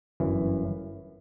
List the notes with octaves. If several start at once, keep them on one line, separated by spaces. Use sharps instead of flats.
G1 F#2 E3